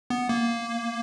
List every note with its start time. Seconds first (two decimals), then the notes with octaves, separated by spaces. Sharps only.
0.10 B3
0.29 A#3